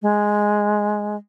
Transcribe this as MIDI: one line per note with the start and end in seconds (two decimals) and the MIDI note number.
0.02 1.16 56